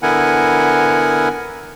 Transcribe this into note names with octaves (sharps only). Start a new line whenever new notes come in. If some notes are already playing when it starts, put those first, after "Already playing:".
D3 B3 E4 A#4 F#5 G#5